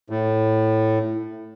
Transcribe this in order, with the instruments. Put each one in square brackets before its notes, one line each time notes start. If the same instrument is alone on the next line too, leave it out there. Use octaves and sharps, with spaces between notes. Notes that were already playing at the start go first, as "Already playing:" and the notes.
[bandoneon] A2